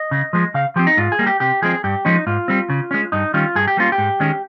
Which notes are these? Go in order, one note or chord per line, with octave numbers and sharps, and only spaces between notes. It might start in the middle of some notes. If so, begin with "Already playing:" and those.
Already playing: D#5
C#3
F3 G#3
C#3 F5
F3 C4 G4
D#4
G#2 F4
G#4
G3 A#3
G4
C3 G4
F3 G#3 C4 G#4
G2 G4
F3 G#3 C#4 D#4
G#2 F4
G3 C4
C#3
G#3 C#4
G2 D#4
D#3 G3 C#4 F4
G2 G#4
G4
G3 A#3 C#4 F4
G4
G#2
D#3 G#3 C#4